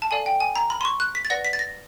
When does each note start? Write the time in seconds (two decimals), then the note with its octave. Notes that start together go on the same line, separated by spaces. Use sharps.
0.02 A5
0.11 A4 D5 F5 G#5
0.26 G5
0.40 G#5
0.56 A#5
0.70 B5
0.81 C6
0.85 C#6
1.00 F#6
1.15 B6
1.25 A6
1.30 B4 D5 F#5 A#6
1.45 B6
1.53 A6
1.59 A#6